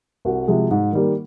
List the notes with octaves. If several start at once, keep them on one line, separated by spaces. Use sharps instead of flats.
C2 F#4
C3 F3 G#3
G#2
D#3 G3 A#3